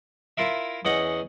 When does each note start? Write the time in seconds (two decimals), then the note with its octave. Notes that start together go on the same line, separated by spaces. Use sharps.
0.37 E4 F4 A#4 E5
0.85 E2 C#4 D#5 F#5